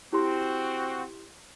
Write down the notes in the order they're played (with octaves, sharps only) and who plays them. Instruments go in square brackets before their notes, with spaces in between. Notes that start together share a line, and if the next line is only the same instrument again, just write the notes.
[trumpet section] C4 F#4 [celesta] E4 G4 C6